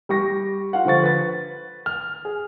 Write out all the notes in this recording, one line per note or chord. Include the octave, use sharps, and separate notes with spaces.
G3 G4 C#6 A#6
F4 F5 F#5
D3 F3 C5 C#6 A6
B4 A6
F6
G#4